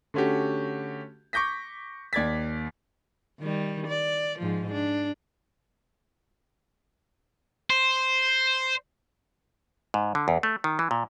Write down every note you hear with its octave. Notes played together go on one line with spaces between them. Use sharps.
D3 A3 C#4 F#4 G4
C#6 D6 G6 A#6 B6
D#2 D5 G#6 A6 B6
D#3 G3
D5
G#2 F3
D4
C5
G#2
D3
E2
A3
D#3
E3
A#2